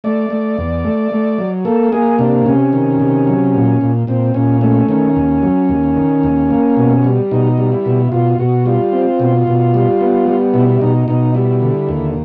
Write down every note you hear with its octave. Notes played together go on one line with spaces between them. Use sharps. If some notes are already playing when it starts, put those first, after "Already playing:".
A3 D5
A3
E2
A3
A3
F#3
A#3 A4
A#3 G#4
C3 D4
C3 C#4
D#3
C3
F#3
A#2
A#2
A#2 C4
A#2 C#4
A3 C#4
D#3 C#4
D#2
F#3
D#2
D#3
D#2
A#3
B2
G3
B2 D#4
G3
E4
B2
B2 F4
B2 F#4
G3 F4
C4
B2
B2
G3
B3
G3
B2 E4
B2 D#4
B2 D#4
G3 E4
D3
D#2